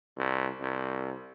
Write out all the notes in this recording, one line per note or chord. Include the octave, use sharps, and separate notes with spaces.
C2
C2